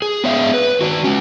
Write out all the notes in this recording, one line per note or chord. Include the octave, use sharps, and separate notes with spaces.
G#4
B3 C#5 E5 F5
B4
D#3 F#4
G#3 C#4